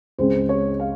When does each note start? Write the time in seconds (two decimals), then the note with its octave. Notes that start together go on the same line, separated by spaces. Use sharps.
0.19 C#2 C#3 G#3 C4 C5
0.49 C#5
0.80 F5